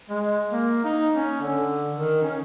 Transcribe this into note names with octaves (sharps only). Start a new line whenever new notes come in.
G#3
A#3
D#4
C#4
D3
D#3
C#4